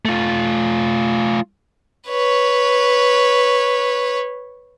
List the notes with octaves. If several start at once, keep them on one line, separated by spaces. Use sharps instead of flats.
A3 F4
B4 C#5